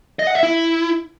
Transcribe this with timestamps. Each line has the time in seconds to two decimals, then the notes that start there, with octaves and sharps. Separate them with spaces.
0.19 D#5
0.27 F#5
0.35 E5
0.43 E4